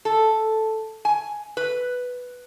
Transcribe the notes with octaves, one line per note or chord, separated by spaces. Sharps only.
A4
G#5
B4